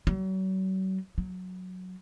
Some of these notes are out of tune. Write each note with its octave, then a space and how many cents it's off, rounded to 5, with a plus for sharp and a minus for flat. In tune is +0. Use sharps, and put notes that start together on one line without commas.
F#3 +40
F#3 -10